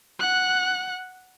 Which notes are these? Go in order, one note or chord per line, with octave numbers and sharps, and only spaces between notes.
F#5 F#6